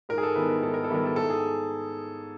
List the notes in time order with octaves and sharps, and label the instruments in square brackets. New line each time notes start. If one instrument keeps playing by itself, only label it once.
[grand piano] G#2 A#4
G#4
A4
D#3 G3 B3 E4 B4
A#4
G#2 A4
A#4
A4
D#3 G3 B3 E4 A#4
A4
G#2 A4
G#4